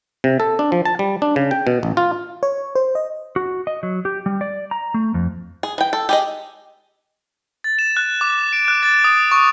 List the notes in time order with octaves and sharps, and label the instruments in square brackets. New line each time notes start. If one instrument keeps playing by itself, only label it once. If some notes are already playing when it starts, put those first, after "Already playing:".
[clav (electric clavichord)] C3
A4
D4
F3
A5
G3
D4
C#3
G5
B2
A1
F4
[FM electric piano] C#5
C5
D#5
[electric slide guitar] F#4
D#5
F#3
G4
G3
D5
A#5
A3
F2
[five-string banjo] G#4
E3 G5
A4
G4 G#4 D#5
[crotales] A6
E7
F#6
D6
D7
F#6
A6
D#6
C#6